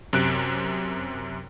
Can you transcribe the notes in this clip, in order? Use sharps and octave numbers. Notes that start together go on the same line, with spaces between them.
F#2 C3 F#6 D7